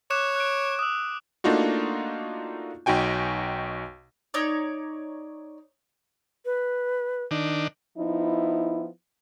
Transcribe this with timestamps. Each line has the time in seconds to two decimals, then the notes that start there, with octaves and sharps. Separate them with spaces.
0.11 C#5 D6 F#6 E7
0.36 F#6 D7
0.79 D#6 E6
1.44 A3 A#3 D4 D#4 F4 F#4
2.86 B1 D#4 F#4 G5 G#5
4.34 D#4 C#5 D5
6.45 B4
7.31 D#3 D4
7.97 F3 B3 D#4 E4